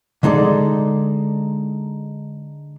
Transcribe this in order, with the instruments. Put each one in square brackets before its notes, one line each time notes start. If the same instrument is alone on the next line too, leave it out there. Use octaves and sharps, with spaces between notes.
[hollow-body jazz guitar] D3 G#3 D#4 A4 D5